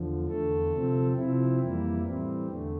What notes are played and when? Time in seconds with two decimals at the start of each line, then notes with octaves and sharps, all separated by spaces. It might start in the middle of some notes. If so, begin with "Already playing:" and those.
Already playing: E2 D3 F3
0.27 E2 D3 A3 A4
0.72 C3 F3 C4
1.16 C3 F3 C4 E4
1.60 F2 E3 G3 A#3 E4
2.04 A2 E3 G3 C4
2.49 E2 D3 A3